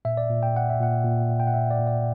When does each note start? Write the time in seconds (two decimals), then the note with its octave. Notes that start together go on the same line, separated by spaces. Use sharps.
0.05 A#2 E5
0.17 D5
0.30 A#2
0.43 G5
0.55 A#2 F#5
0.70 E5
0.80 A#2 F#5
1.04 A#2
1.30 A#2
1.40 G5
1.47 F#5
1.54 A#2 E5
1.71 D5
1.79 A#2
1.87 D5